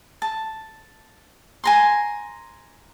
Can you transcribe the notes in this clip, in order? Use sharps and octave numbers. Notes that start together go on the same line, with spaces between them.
A5
G#5 A#5 C6